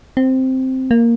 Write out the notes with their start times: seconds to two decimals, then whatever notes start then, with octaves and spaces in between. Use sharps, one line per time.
0.17 C4
0.91 A#3